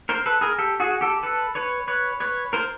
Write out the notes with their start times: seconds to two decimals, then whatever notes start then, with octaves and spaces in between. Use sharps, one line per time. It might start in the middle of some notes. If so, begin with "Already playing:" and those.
0.09 A#4 C5
0.26 A4 B4
0.41 G#4 A#4
0.58 G4 A4
0.80 F#4 G#4
1.01 G4 A4
1.23 A4 B4
1.55 B4 C#5
1.88 B4 C#5
2.20 B4 C#5
2.53 A#4 C5